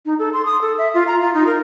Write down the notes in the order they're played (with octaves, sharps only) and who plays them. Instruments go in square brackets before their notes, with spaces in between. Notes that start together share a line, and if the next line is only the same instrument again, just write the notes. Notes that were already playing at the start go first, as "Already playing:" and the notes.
[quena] D#4
A4
C6
D#6
A4
E5
F4
A#5
F4
D#4
A#4